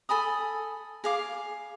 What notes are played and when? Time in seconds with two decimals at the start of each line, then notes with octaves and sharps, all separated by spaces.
0.09 A4 G#5 B5 D#6
1.04 G#4 F5 D6